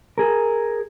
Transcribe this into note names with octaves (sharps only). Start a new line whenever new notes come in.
G#4 A#4